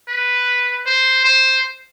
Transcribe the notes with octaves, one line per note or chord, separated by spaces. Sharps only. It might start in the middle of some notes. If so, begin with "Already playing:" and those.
B4
C5
C5